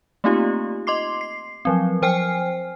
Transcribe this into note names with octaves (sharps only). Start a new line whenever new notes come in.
A3 A#3 C4 D#4 F4 G4
D#5 C6 D6 C7
C7
F3 F#3 C4
F3 C5 G5 G#5 F6 C7